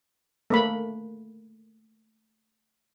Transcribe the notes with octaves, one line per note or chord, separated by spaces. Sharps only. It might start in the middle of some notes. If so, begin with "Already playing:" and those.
A3 A#3 B5